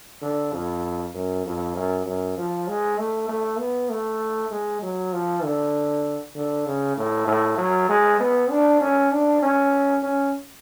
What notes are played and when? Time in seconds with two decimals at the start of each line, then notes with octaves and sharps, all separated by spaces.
0.22 D3
0.53 F2
1.14 F#2
1.45 F2
1.76 F#2
2.06 F#2
2.37 F3
2.68 G#3
2.98 A3
3.28 A3
3.59 B3
3.90 A3
4.51 G#3
4.82 F#3
5.13 F3
5.44 D3
6.35 D3
6.66 C#3
6.97 A2
7.27 A2
7.58 F#3
7.89 G#3
8.20 B3
8.50 D4
8.81 C#4
9.12 D4
9.42 C#4
10.03 C#4